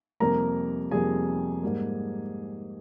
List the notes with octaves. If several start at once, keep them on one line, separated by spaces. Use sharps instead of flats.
F2 C3 G3 A#3 A#4 A#5
F2 C3 G3 A#3 G#4 G#5
G#2 G3 A#3